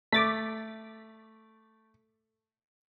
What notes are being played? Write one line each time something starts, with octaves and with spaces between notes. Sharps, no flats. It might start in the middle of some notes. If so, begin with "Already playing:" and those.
A3 D6 A6 B6